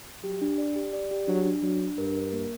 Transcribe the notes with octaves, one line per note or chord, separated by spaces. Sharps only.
F#3 G4
D4
D5
G4
D5
G4
F#3 D4
D4
F#3 D4
D4
G2 A#4
A#4
A#3